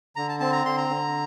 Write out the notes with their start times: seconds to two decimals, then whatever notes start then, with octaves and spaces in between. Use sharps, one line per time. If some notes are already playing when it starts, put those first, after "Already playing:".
0.16 D3 A#5
0.29 A5
0.40 C4 A5
0.53 A#5
0.65 D3 C6
0.77 A#5
0.89 D3